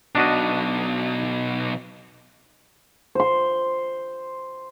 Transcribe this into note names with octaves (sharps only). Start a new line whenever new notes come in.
B1 B2 D4 F#4 D#5
C5 C6